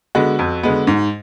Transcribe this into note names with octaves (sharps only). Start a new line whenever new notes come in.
D3 G#3 B3 F#4
F2
D3 G#3 B3
G#2